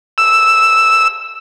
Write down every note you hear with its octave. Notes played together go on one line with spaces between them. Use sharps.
E6